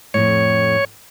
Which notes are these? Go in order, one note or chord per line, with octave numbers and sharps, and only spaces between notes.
F2 A2 C#5